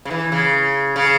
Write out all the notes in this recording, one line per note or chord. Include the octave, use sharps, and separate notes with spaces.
C#3
E3
C#3
C#3